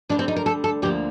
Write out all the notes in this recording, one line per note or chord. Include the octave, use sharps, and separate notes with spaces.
D2 D3 G3 D4
C4
D#4
A#4
A4
A4
D2 D3 F3 A#3 G4